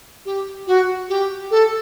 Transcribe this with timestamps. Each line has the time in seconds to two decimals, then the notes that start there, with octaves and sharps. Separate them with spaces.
0.25 G4
0.67 F#4
1.09 G4
1.50 A4